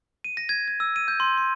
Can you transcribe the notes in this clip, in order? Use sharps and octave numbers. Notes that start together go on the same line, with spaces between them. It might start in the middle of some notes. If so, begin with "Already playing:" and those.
D#7
A#6
G#6
G#6
E6
D#7
G6
C6
C6